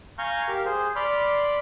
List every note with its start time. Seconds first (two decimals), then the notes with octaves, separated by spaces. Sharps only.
0.19 F5 G#5 A#5 C#6 F6 G6
0.48 G4 A#4 F5
0.65 G#4 C5
0.96 D5 B5 C6 D6 F6